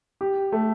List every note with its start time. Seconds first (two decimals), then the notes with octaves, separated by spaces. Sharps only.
0.21 G4
0.52 A3